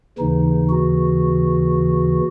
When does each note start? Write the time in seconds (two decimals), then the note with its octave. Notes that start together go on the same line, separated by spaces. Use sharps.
0.19 D#2 C#3 E3 D#4
0.69 F#4